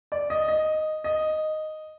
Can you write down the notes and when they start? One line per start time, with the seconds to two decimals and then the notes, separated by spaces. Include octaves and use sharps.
0.12 D5
0.30 D#5
0.48 D#5
1.04 D#5